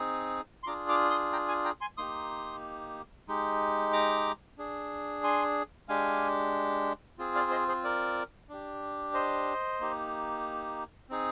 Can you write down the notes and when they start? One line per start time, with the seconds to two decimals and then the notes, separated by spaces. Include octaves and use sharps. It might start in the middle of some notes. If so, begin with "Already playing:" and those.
Already playing: C4 D#4 G#4
0.63 C6
0.67 D4 F4 G#4 A#5 D6
0.89 D6 F6
1.10 C6 D#6
1.33 G5 A#5
1.48 F5 G#5
1.65 G5 A#5
1.81 G#5 C6
1.97 A#3 D#4 G4 C6 D#6
3.28 G#3 D#4 G4
3.93 A#5 D6
4.58 D4 G#4
5.24 G#5 C6
5.88 G#3 D4 G4 F5 G#5
7.19 C4 F4 G#4
7.35 D5 F5
7.51 C5 D#5
7.68 G#4 C5
7.84 A#4 D5
8.49 D4 G4
9.14 C5 D#5
9.80 A#3 D#4 G4
11.09 C4 D#4 G#4